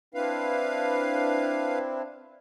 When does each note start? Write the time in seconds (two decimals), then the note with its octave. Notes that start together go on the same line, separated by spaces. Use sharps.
0.14 C4 D4 E4 B4 F5